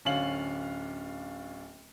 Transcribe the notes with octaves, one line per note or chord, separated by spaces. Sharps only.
D1 D3 C#4 F5 F#7